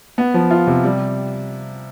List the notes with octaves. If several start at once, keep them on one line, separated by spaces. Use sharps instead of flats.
B3
F3
F4
C3
G3